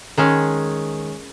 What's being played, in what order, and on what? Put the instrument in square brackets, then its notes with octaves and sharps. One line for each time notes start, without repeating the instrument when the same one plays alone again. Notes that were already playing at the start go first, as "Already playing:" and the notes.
[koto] D#3 G#3 C#4